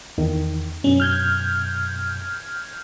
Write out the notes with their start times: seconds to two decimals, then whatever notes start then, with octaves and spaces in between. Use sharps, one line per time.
0.18 E2 D#3
0.84 F#2 B2 C#4
1.00 F6 G6 G#6